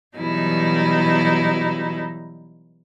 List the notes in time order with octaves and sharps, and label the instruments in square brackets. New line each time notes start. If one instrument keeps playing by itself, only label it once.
[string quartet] B2 E3 F#3 G3 D#4 E4